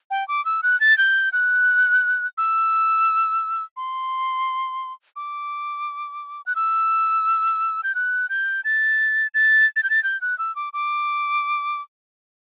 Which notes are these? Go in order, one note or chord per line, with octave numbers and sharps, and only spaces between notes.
G5
D6
E6
F#6
A6
G6
F#6
E6
C6
D6
F#6
E6
G6
F#6
G6
A6
A6
A6
G6
A6
G6
F#6
E6
D6
D6